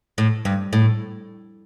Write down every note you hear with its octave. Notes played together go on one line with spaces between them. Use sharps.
A2
G2
A2